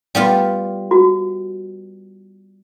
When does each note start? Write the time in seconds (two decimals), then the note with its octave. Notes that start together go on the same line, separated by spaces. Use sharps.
0.15 G3 B3 F4
0.91 F#4